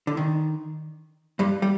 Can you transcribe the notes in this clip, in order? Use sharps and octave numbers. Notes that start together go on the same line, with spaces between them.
D3
D#3
G2 G3
G3